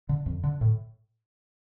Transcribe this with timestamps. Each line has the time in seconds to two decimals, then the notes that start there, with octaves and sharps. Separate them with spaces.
0.09 D3
0.26 F2
0.44 D3
0.61 A2